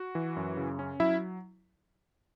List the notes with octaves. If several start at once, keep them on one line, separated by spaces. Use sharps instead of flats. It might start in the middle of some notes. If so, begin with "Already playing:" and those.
Already playing: F#4
E3
F#2
C#3
C#4
F#3 E4 E5